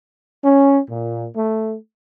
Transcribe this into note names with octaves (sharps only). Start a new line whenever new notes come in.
C#4
A#2
A3